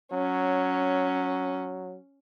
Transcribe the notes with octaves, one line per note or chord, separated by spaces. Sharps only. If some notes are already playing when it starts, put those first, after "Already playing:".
F#3 C#4